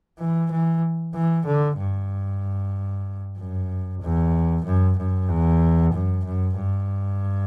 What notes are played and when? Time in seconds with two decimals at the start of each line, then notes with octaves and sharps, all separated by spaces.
0.19 E3
0.51 E3
1.15 E3
1.46 D3
1.78 G2
3.38 F#2
4.02 E2
4.65 F#2
4.97 F#2
5.29 E2
5.93 F#2
6.25 F#2
6.57 G2